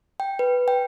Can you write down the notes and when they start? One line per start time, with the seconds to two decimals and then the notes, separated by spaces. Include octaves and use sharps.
0.20 G5
0.39 B4
0.68 G5